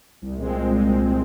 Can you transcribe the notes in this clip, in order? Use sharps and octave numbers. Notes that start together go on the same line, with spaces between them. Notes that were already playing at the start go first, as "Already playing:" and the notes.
C2
A#2 G#3 C4
C2
A#2 G#3 C4
C2
A#2 G#3 C4